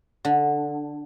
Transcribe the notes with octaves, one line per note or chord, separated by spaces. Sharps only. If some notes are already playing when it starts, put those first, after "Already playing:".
D3